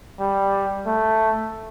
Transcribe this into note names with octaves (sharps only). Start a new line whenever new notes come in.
G3
A3